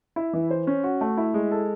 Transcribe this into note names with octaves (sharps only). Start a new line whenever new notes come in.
E4
E3
C5
C#4
F#4
A3
E4
G#3
A4